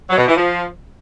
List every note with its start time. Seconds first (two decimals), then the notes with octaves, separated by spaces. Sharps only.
0.09 F#3
0.18 B2
0.27 E3
0.35 F3